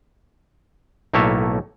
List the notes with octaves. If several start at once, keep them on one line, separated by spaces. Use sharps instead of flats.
B1 A2 A3 A#3 C#5 E5